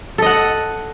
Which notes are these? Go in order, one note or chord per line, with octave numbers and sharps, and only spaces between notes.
A4 D#5 F#5